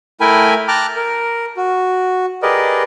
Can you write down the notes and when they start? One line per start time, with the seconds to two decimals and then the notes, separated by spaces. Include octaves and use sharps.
0.21 A3 E4 A#4 G5 G#5 B5
0.68 G5 A5 A#5 D6 F6 F#6
0.97 A#4
1.57 F#4
2.42 G4 G#4 A#4 B4 D5 D#5